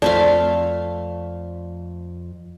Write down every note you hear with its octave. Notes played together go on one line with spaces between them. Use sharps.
F2 A3 C4 F4 D5 E5 F5